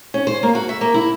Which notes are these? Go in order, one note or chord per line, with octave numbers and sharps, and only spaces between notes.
C#4
C5
A#3
F#4
E5
A#3
E4